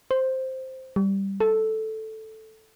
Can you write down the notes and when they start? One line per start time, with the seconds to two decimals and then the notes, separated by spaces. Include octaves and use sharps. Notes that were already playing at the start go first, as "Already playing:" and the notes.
0.11 C5
0.96 G3
1.40 A4